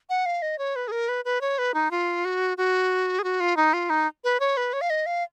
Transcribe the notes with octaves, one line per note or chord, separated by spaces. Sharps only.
F#5
F5
D#5
C#5
B4
G#4
A#4
B4
B4
C#5
B4
D#4
F4
F#4
F#4
G#4
F#4
F4
D#4
F4
D#4
B4
C#5
B4
C#5
F5
D#5
F5